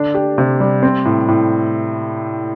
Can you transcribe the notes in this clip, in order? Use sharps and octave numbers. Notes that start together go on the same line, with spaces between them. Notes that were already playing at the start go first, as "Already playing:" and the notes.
Already playing: D3 D4
G4
C3
G3
C4
A2
A2